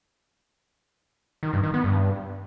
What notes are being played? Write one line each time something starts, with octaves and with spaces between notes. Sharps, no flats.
D#3
G2
D#3
B3
G2